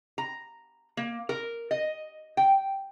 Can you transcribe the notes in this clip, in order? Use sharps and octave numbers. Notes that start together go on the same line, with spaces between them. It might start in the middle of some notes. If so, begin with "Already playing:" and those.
A#5
A#3
A#4
D#5
G5